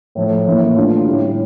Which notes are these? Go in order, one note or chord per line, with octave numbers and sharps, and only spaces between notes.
A2 F3 A3
A2 E3 A#3 C#4
D3 A3 D4 F4
A2 G3 C#4 E4 G4